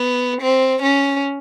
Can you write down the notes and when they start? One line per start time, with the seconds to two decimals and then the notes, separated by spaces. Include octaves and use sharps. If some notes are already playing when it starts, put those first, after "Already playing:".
Already playing: B3
0.41 C4
0.82 C#4